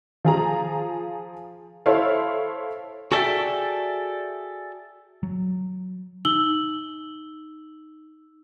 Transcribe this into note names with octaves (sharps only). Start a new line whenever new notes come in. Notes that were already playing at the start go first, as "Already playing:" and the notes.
F3 G#4 A#5
E4 A4 C5 C#5 F5
F#4 G#4 A4 D5 E5 G5
F#3
D#4 E6 F#7 G7